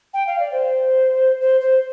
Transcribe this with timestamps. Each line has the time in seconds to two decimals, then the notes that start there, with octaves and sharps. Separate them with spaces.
0.13 G5
0.26 F5
0.39 D5
0.51 C5
1.41 C5
1.60 C5